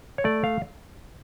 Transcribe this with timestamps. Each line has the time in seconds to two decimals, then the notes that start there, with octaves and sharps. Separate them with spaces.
0.18 C#5
0.24 A3 D5
0.44 F5